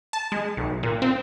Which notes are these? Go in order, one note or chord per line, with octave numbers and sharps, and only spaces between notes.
A5
G#3
B1
A#2
C4